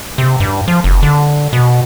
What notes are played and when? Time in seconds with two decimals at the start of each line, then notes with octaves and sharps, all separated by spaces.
0.18 C3
0.40 G2
0.68 F3
0.84 F#1
1.02 D3
1.53 B2